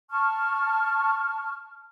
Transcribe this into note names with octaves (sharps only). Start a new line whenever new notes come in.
A5 C#6 F6